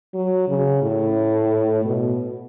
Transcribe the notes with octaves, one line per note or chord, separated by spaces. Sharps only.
F#3
C#3
A2
B2